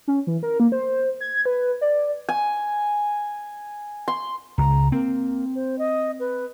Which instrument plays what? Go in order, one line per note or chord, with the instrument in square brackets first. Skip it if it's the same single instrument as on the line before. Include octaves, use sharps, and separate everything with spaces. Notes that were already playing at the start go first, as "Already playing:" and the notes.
[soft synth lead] C#4
E3
A#4
A#3
C5
G#6
B4
D5
[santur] G#5
C6
[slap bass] C#2 [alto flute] A#5
[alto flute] A#3 [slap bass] C4
[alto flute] C5
D#5
B4